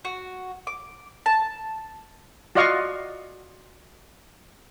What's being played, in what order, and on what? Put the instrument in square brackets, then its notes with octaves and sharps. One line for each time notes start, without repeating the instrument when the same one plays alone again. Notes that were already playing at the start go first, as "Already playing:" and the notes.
[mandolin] F#4
D6
A5
[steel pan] F4 F#4 D5 D#5 F5 C#6